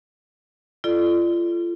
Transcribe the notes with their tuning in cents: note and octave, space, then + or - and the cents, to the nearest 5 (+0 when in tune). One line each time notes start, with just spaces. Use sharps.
F4 -30 A4 -15 D5 +25